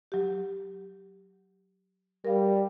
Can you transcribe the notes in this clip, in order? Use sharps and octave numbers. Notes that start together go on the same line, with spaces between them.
F#3 G4
G3 A#4 F5